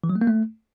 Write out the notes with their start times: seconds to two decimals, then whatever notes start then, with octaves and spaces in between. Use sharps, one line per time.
0.04 E3
0.10 F#3
0.15 A3
0.21 A#3
0.27 A3